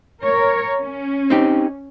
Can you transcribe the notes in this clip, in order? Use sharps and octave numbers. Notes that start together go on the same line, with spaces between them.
A#4 C#5
C#4
C4 D#4 G4